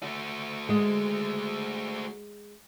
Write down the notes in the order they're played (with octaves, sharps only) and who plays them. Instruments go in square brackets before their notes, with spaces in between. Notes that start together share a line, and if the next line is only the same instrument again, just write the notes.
[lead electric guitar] A3 F#4
[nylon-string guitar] G#3